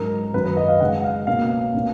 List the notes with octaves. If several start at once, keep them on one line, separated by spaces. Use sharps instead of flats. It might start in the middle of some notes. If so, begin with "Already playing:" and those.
Already playing: G#2 F#3 C#4 A#4
F#2 D#3 F#3 C#4 B4
B4
D#5
F5
C#3 G#3 D#4 F#5
F5
B2 A#3 C#4 F5
B2 A#3 C#4